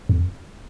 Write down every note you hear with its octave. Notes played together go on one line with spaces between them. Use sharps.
F2